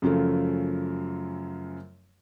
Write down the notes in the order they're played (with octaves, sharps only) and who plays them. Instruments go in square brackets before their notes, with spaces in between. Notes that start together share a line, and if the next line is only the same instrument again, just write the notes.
[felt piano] F#2 C#3 F3 A3